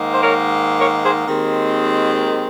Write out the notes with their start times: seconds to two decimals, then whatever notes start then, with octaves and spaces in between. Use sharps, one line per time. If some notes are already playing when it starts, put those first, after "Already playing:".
Already playing: G#2 D#3 A#3
0.12 C5
0.22 A#4 C#5
0.79 A#4 C#5
1.03 G#4 C5
1.26 D#2 D#3 G#3 C4